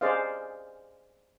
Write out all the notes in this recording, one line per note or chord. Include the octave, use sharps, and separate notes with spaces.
G#4 C5 D5 D#5 F5